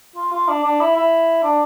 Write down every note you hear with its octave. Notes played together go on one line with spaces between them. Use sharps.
F4
F4
D4
D4
E4
E4
D4